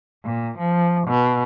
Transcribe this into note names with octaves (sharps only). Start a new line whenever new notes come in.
A#2
F3
B2